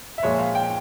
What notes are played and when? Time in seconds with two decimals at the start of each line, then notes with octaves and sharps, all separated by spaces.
0.18 E5
0.23 A#2 F3 G#3 C#5
0.39 F5
0.55 G5